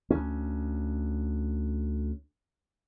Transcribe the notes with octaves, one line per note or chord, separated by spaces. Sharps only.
D2 C#4